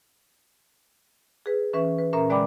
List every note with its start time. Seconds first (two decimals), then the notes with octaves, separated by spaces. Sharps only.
1.46 G#4 B4
1.73 E3 C#4 B4 E5 C#6
1.99 B4
2.13 A#2 C#4 A#4 E5 A#5
2.30 D3 G#3 D5 G5 B5 D6